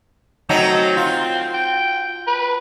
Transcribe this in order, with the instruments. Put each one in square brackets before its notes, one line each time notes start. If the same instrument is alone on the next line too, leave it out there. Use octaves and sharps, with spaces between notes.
[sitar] F#3 A3 D#4 [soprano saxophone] C4
[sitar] F4
[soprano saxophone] G5
B4